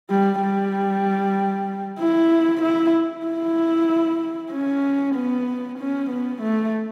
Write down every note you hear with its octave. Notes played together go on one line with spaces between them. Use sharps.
G3
G3
E4
E4
E4
C#4
B3
C#4
B3
A3